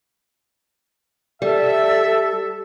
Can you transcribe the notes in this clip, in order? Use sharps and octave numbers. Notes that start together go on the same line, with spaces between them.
G3 A4 E5